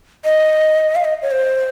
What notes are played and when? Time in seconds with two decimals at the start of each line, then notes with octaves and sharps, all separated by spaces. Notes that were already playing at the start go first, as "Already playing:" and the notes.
0.25 D#5
0.96 F5
1.05 D#5
1.22 C#5
1.31 C5